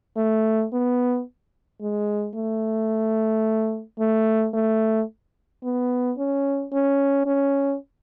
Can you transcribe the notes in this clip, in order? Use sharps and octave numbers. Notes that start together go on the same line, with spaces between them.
A3
B3
G#3
A3
A3
A3
B3
C#4
C#4
C#4